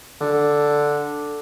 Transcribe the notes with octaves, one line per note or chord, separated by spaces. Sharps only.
D3